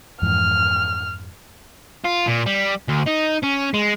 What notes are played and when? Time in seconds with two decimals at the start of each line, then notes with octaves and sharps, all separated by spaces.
0.22 F2 G#2 E3 F6
2.05 F4
2.28 A#2
2.46 G3
2.88 D2
3.06 D#4
3.43 C#4
3.74 G#3